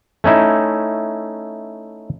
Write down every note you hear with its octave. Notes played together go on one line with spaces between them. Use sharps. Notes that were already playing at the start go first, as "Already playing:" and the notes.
A3 C#4 D#4 E4